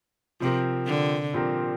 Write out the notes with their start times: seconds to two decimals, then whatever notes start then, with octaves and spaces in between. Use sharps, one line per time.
0.40 C3 F3 C4 G4 A#4
0.87 D3
1.33 A#2 F3 C4 G4 A#4